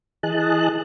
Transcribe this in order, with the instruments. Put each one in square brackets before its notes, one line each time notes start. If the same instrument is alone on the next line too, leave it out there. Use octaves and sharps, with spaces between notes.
[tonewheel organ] E3 G#4 D#5 A5 F#6